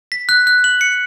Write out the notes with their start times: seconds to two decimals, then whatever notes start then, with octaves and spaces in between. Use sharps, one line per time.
0.12 B6
0.29 F#6
0.47 F#6
0.64 F#7
0.81 C#7